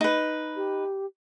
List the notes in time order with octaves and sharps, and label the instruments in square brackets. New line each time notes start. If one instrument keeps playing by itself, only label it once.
[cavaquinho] D#4 B4
[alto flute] G4